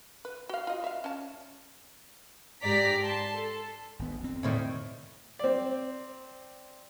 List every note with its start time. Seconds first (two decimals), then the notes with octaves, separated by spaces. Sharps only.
0.25 B4
0.49 F#4 F5
0.67 F4 D#5
0.84 E5 F5
1.04 C#4 A5
2.63 G#2 G4 D5 A#5 B6
3.02 A5 C6
3.35 A4
3.99 G#1 B3
4.20 F2 C4
4.43 D2 A2 D#3
5.39 C4 D5